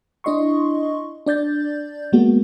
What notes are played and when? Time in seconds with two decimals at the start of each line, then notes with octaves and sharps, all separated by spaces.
0.24 D4 E4 D#5 C6 C#6
1.26 D4 D5 G6 A6
2.12 F#3 G#3 A#3 B3 F#4